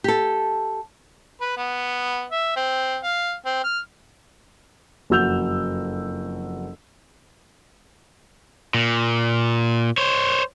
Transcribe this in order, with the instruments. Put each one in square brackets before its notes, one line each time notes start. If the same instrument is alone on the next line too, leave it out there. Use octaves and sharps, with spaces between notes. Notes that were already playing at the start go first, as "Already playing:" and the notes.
[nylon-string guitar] G4 A4
[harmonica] B4
B3
E5
C4
F5
C4
F6
[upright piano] F#1 F2 F#4 E6 G6 F7
[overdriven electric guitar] A#2
C5 C#5